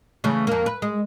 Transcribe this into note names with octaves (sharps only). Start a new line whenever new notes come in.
C#3 E3 A3
F2 A#3
B4
G#3